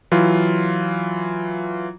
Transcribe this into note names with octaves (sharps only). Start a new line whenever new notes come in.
E3 F#3 F4